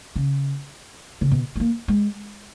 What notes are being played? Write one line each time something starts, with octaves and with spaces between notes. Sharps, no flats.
C#3
C#3
B2
G#3
A#3
G#3